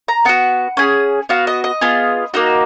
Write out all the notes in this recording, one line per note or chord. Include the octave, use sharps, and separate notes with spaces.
A#5
B3 F#4 F#5
C#4 G#4
B3 F#4 F5
D#5
D#5
B3 F4 G#4
A#3 D#4 F#4